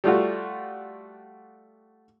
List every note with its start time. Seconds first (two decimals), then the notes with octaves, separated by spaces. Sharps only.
0.04 G3 A3 F4 F#4